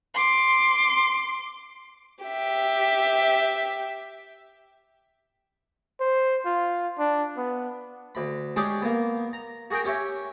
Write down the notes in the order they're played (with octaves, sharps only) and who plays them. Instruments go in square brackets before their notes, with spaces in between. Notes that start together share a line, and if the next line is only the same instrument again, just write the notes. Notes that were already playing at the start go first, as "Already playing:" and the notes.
[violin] C6 D6
G4 E5
[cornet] C5
F4
D4
B3
[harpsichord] D2 B5
G#3 C#4 D4 G4 G#4
A#3 B3
A#5
F#4 G#4 A#4 G5
C#4 G4 C#5 E5